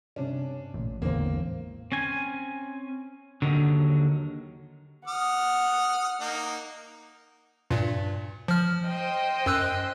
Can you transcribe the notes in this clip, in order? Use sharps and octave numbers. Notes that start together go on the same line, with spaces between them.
G2 C3 C#4 D4
A1 A#2
A1 E2 D3 G#3 A#3 C4
C4 C#4 G#5
D#2 D3 D#3 F#3
F#5 D#6 F6
A#3 D#4
G2 A#2
F3 F6
C5 D#5 G5
F#2 E6 F#6